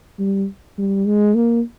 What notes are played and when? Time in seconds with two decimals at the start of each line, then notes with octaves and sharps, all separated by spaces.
0.19 G3
0.78 G3
1.06 G#3
1.35 A#3